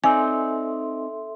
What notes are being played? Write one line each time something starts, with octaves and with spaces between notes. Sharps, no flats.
C4 D#4 A4 D5 E5 G#5 C6